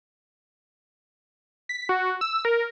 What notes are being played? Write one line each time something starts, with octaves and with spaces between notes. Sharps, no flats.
B6
F#4
E6
A#4